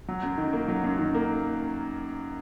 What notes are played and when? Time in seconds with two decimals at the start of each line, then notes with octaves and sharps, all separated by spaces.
0.08 F#3
0.23 F#2
0.38 D#3
0.53 A#3
0.68 F#3
0.84 F#2
0.98 D#3
1.15 A#3